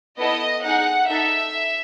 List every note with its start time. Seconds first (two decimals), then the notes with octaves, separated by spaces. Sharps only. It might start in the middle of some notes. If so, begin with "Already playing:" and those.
0.19 B3 E4 A4 D#5
0.65 D#4 G#4 F#5
1.09 D#4 A4 E5